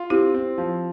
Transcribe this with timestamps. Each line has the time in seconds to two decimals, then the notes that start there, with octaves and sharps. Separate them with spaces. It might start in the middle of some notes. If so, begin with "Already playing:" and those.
Already playing: F4
0.10 C4 E4 G4
0.34 C4
0.58 F3